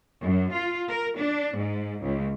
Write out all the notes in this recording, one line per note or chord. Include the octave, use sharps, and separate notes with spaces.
F#2
F4
A#4
D4
G#2
C#2